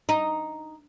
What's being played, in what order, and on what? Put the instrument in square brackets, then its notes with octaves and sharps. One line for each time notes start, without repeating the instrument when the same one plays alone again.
[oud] D#4